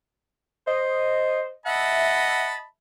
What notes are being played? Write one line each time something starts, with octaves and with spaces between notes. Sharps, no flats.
C5 D#5
D#5 E5 F#5 A5 B5